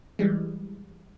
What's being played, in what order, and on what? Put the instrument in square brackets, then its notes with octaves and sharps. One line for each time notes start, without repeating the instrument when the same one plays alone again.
[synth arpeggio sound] E3 G3 G#3